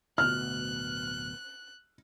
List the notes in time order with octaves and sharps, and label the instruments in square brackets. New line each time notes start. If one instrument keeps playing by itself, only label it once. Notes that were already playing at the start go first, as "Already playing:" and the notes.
[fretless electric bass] D1 D2 B2 [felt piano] F6 [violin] F#6